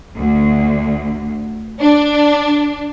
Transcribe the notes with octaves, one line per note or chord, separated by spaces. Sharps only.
D2
D4